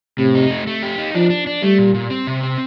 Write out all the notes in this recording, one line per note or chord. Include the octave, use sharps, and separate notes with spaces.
A2 C3
D#4
A3
A3
G4
D#4
F3 D4
D4
D4
G3 A3
A#2
A#2
C4
C3
C4